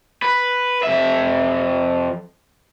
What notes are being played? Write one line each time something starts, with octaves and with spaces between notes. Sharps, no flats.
B4
F2 E5